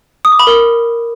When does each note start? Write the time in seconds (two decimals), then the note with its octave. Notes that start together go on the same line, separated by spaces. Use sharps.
0.25 D#6
0.32 D6
0.40 B5
0.47 A#4